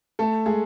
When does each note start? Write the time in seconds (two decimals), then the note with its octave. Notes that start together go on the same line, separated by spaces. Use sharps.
0.19 A3 A4
0.46 G#3 G#4